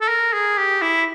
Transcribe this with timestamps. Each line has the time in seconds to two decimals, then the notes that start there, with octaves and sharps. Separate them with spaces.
0.01 A4
0.08 A#4
0.33 G#4
0.58 G4
0.82 E4